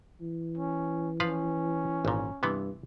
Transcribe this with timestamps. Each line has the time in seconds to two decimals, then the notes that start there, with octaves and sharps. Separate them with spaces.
0.21 E3
0.58 C#4
1.20 F3 C#4 B4 F5
2.05 G#1 A#2
2.43 G2 C3 E3 B3